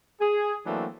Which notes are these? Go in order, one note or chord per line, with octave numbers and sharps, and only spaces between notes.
G#4
E3 F#3 A3 A#3 C4 D4